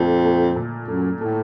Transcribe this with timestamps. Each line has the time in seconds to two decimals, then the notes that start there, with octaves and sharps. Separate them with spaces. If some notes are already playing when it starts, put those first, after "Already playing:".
Already playing: F2 A#2 A3
0.25 A3
0.56 A#2
0.88 F#2 A3
1.21 A2 A3